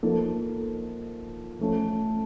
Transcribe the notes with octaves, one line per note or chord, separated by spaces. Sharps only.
F3 A#3 D#4 A4
F3 A3 C#4